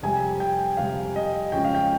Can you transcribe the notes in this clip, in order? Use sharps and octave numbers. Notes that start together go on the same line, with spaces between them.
F2 C3 G3 G#5
G5
F2 C3 G3 F5
D#5
F2 C#3 G#3 C#4 F4 G5
F5
G5